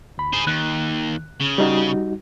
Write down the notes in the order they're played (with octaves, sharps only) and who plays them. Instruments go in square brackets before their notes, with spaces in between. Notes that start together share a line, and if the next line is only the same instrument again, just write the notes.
[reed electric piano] D2 B5
[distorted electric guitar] G#4 C5
[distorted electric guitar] D#2 [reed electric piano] F#6
[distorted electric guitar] C#3
[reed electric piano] G3 D#4 F#4